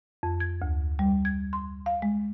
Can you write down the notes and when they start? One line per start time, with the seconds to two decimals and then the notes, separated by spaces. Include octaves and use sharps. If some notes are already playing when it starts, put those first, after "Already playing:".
0.23 F2
0.40 G#6
0.62 D2
0.99 G3
1.25 G#6
1.53 C6
1.86 F5
2.02 G#3